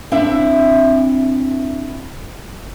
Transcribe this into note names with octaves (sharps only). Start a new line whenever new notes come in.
C4 D4 E4 E5